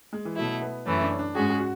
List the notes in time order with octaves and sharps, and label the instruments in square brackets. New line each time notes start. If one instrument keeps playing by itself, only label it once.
[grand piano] G#3
E3
[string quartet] B2 A3 E4 [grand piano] F#3
[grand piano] B3
[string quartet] F#2 E3 A3 [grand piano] C#4
[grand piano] E4
D4
C#4
D4
[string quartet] G#2 G#3 C#4 F#4 [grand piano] G#4
[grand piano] G#4
F#4